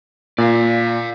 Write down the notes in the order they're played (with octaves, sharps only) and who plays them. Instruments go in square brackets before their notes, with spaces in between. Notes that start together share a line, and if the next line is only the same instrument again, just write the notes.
[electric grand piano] A#2 [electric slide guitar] D5 F5